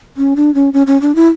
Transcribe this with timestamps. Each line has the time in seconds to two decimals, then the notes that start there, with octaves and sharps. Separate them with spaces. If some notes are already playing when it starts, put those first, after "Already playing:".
0.17 C#4
0.36 D4
0.55 C#4
0.73 C#4
0.87 C#4
1.01 D4
1.15 E4